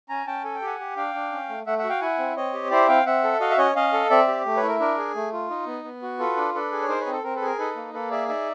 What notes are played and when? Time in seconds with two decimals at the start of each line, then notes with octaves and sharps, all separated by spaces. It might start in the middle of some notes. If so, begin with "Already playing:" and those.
0.09 C#4 G#5 A#5
0.27 C#4 G5 A5
0.44 A4 G#5
0.55 G5
0.62 G4 F#5 G#5
0.79 G4
0.96 D4 F5 G5
1.14 D4
1.32 C#4
1.49 A3
1.66 A3 E5 F#5
1.78 E5 F#5
1.84 F#4
1.89 F5 G5
2.01 E4 F#5 G#5
2.19 C4
2.36 C4 C#5 D#5
2.53 G4
2.71 E4 C5 D5
2.88 C4 F5 G5
3.06 C4 E5 F#5
3.24 A4
3.40 F#4 D#5 F5
3.50 E5
3.58 C#4 C#5 D#5
3.75 C#4 D#5 F5
3.93 A4
4.10 C4 D5 E5
4.28 G4
4.46 A3
4.57 B4 C#5
4.63 E4
4.68 A#4
4.80 D4 A#4
4.98 G#4
5.15 A3
5.33 F4
5.50 D#4
5.66 B3
5.84 B3
6.02 F#4
6.19 F4 A4 B4
6.37 D4
6.54 D4 A4 B4
6.72 G#4
6.82 C#5
6.88 D#4 A#4 C5
7.00 B4 C#5
7.06 C4
7.12 A4
7.24 C4 A#4
7.36 A4 B4
7.41 G#4
7.46 A#4
7.59 D#4 A4 B4
7.76 A#3
7.93 A#3 A4 B4
8.10 G#4 D5 E5
8.28 D#4 D5 E5